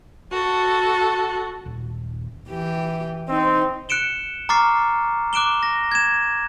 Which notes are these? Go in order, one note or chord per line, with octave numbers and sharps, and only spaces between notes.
F#4 A4
D#1
E3 G4
C4 D#4
F#6 C#7 D7 E7 G7
A#5 C#6 D6 F6 A6 C7
D6 F#6 D7 E7 G7
A#6
G#6 E7